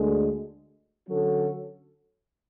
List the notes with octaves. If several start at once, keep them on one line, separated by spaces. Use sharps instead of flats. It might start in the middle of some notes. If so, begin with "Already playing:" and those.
Already playing: D2 D3 G#3
D3 F#3 C#4 F#4 A4